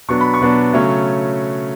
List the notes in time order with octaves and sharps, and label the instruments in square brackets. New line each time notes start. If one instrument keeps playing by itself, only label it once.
[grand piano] B2 F#3 B3 D4 C#6
B5
C#6
B2 F#3 B3 D4
C#3 F#3 A3 C#4